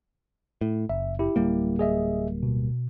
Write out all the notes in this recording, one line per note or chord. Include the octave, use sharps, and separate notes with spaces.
A2
F#1 E5
E4 G4
D1 G3 A#3
G#4 D#5 E5
B2